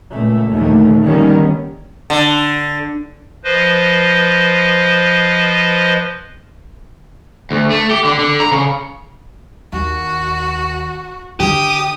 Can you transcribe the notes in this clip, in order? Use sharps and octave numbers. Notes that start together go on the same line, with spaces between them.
C#2 A#2 A3
A#1 D#2 D3 D#3 A3
D3 D#3 G3 A#3 B3 C#4
D3
F3 B4 C5 D#5
D2
A3
G4
D3
D3
A#5
C#3
D#2 F#4
D3 G4 D#6